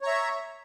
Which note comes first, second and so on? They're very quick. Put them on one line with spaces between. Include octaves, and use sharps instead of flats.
C#5 A#5 E5